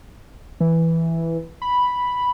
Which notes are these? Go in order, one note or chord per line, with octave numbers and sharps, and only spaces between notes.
E3
B5